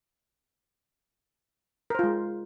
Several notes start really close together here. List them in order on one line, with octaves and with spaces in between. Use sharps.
A#4 C5 F4 G#3